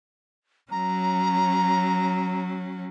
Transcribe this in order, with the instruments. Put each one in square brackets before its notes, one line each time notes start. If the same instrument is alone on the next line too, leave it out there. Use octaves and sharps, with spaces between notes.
[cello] F#3 C#4 [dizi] A#5